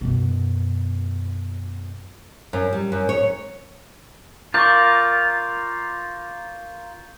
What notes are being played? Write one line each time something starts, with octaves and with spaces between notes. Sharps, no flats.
F#2 B2
F#2
G3
F#2
C#5
F4 A#4 D5 C#6 G6